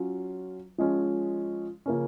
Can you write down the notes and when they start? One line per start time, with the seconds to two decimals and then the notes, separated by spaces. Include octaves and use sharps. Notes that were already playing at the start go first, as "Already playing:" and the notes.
Already playing: F#3 C#4 F4
0.78 F3 G#3 C#4
1.86 C#3 F3 A#3 C#4